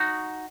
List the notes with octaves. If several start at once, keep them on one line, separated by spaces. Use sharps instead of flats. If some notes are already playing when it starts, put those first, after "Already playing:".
Already playing: D#4 F#4